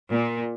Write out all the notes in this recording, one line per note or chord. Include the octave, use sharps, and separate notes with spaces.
A#2